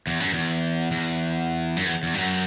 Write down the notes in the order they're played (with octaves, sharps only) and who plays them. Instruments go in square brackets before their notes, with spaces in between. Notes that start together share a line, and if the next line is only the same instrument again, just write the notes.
[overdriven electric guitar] E2
F#2
E2
E2
F#2
E2
E2
G2
F#2